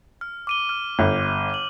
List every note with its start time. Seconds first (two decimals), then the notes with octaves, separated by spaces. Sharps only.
0.21 F6
0.47 D6 D#7 G7
0.69 F6
0.99 G1
1.54 F#7